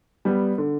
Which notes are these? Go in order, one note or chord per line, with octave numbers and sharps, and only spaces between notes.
G3 B3
D3